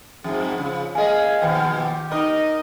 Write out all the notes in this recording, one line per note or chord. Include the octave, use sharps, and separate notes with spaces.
F2 G#2 G#4
C#3 F3
A#3 G#4 D#5 F5 G#5
D#2 B2 F3 G5
G4
D#4 A#4 D#5